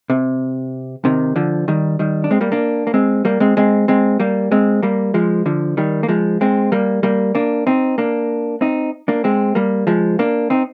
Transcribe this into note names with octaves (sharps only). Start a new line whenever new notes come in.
C3
C3 D#3
D3 F3
D#3 G3
D#3 G3
D4
G#3 C4
G3 A#3
A#3 D4
A#3
G#3 C4
G3 A#3
G#3 C4
G#3 C4
G#3 C4
G3 A#3
G#3 C4
G3 A#3
F3 G#3
D3 F3
D#3 G3
A#3
F3 G#3
G#3 C4
G3 A#3
G3 A#3
A#3 D4
C4 D#4
A#3 D4
C4 D#4
A#3 D4
G#3 C4
G3 A#3
F3 G#3
A#3 D4
C4 D#4